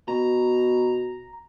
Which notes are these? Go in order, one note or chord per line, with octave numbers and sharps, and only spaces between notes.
B2 A#5